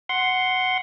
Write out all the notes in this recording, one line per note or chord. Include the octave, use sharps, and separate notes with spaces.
F#5 C6